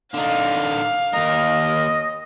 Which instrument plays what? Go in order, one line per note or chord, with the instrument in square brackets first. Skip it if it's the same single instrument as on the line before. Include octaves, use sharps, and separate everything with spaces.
[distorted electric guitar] D3 D#4 [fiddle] F5
[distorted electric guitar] D#2 A#4 [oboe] D#5